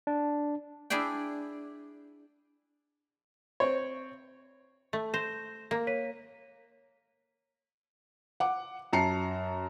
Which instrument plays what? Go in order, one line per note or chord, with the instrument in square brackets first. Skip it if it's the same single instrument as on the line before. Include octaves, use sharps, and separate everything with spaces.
[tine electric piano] D4
[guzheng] D4 E4 G#4 D5 G5
[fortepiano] C4 C#5
[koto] A3
[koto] C5 [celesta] G6 A#6 E7
[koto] A#3
[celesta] C#5 B6 D#7
[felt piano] F#5 D6
F#2 A5 A#5 C7 C#7